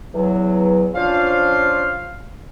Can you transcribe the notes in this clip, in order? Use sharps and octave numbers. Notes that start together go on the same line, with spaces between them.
E2 F#3
F3 C#4 D4 F4 C5 F5